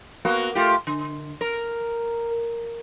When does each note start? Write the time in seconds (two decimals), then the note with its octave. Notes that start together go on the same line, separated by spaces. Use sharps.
0.25 A#3 B3 F#4
0.55 A3 F4 G4
0.87 D3
1.41 A#4